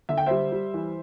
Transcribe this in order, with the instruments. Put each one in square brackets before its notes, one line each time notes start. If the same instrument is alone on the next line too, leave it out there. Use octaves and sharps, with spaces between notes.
[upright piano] D3 E5
G5
G3 C5 E5
G3
E3